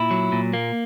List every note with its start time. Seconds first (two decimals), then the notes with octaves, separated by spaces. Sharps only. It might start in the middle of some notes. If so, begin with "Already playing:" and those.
Already playing: A#2 E4
0.11 F#3
0.32 A#2
0.53 A#3